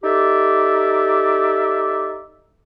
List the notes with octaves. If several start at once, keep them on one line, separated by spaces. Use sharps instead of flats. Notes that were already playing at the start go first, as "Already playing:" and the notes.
D#4 G4 A4 D5 E5